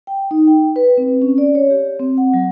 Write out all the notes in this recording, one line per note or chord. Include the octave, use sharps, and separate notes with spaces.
G5
D#4
G5
B4
C4
C#4
D5
C#5
G4
C4
F#5
F#3